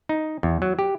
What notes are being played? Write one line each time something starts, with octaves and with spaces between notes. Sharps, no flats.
D#4
E2
F#3
G4